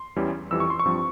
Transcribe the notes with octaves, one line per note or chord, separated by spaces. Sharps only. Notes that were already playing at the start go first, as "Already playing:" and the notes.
Already playing: C6
E2 E3 G3 C#4
F2 E3 G3 E6
C#6
C6
C#6
G2 F3 C4